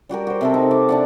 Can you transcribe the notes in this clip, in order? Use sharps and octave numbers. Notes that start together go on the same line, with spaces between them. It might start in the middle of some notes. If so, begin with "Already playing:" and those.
G3 F#4 G4 A#4
F#4 C5
C3 C4 A4
D#4
D6
D4 D5 F#5